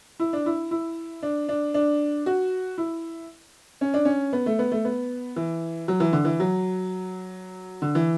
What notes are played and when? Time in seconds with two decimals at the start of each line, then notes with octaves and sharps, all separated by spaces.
0.20 E4
0.33 D4
0.46 E4
0.71 E4
1.23 D4
1.49 D4
1.74 D4
2.26 F#4
2.78 E4
3.81 C#4
3.94 D4
4.05 C#4
4.33 B3
4.46 A3
4.59 B3
4.72 A3
4.85 B3
5.36 E3
5.88 F#3
6.00 E3
6.13 D3
6.25 E3
6.40 F#3
7.82 D3
7.95 E3